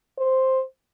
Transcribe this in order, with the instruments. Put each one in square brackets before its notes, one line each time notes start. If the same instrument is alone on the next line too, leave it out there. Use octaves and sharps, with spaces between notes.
[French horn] C5